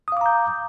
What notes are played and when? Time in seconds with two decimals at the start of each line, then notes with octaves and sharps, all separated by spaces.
0.08 D#6
0.12 F5
0.17 D6
0.21 A#5
0.26 G6